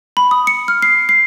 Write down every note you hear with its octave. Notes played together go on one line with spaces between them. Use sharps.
B5
D#6
C#7
F6
C7
C7